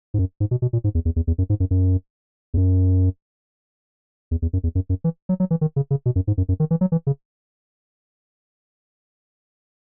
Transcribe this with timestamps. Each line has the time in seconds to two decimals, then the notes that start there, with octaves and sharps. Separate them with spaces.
0.14 G#2
0.19 F#2
0.40 G#2
0.51 B2
0.62 B2
0.73 A#2
0.84 G#2
0.95 E2
1.05 E2
1.16 E2
1.27 E2
1.38 F#2
1.50 G#2
1.60 F#2
1.71 F#2
2.54 E2
2.57 F#2
4.31 E2
4.42 E2
4.53 F#2
4.64 E2
4.75 F#2
4.89 F#2
5.04 E3
5.29 F#3
5.40 F#3
5.51 E3
5.61 D#3
5.76 C#3
5.91 C#3
6.06 B2
6.16 F#2
6.27 G#2
6.38 F#2
6.49 F#2
6.60 D#3
6.71 E3
6.81 F#3
6.92 E3
7.07 C#3